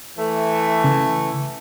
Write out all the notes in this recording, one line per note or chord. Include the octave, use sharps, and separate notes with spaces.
E3 A3
C#3